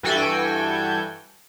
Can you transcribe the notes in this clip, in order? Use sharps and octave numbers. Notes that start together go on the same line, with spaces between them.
G2 E3 F#4 A4 G5 G#5